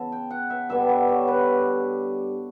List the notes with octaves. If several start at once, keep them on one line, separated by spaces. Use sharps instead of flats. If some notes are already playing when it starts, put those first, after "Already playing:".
Already playing: C#3 E3 B3 E5 A5
G5
F#5
E5
G2 D3 G3 B3 E5
D5
C#5
B4